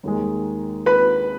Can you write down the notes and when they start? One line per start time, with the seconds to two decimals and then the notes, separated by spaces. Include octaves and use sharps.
0.03 D#2 D#3 G#3
0.86 B4 B5